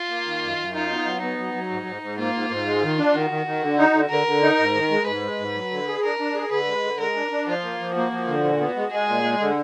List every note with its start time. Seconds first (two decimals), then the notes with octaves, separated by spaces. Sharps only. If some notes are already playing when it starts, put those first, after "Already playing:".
Already playing: F4
0.10 A#3
0.25 D#3
0.42 F#2
0.58 F#2
0.74 D#4 F4
0.90 B3
1.05 F#3
1.22 B3 D#4
1.39 F#3
1.54 F#3
1.70 G#2
1.86 G#2
2.02 G#2
2.19 A#3 F4
2.34 G#2
2.50 G#2
2.66 G#3
2.83 D#3
2.99 D4
3.14 D#3 F#4
3.30 D#3
3.46 D#3
3.62 D3
3.78 D#4
3.94 D3
4.10 D3 A#4
4.27 D3
4.42 D#4
4.58 G#2
4.75 D#3
4.91 G#3
5.07 G#2 B4
5.23 G#3
5.39 G#2
5.55 F#3
5.71 D3
5.87 G#4
6.04 D4 A#4
6.19 D4
6.35 G#4
6.51 D3 B4
6.67 G#3
6.84 D3
6.99 G#3 A#4
7.16 D4
7.31 D4
7.47 F3 F4
7.63 A#3
7.80 F3
7.96 A#3 F#4
8.12 F3
8.27 D3
8.44 A#2
8.60 B3
8.76 G#3
8.91 G#3 G#4
9.08 A#2
9.23 G#3
9.40 D3